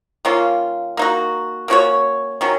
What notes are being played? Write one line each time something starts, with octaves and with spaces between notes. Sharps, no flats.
D#3 A#3 C#4 F4
A#3 D#4 F#4
A#3 C#4 F#4 C#5
D#3 F#3 C#4